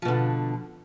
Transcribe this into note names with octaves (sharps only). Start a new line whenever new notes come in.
B2 D3 F3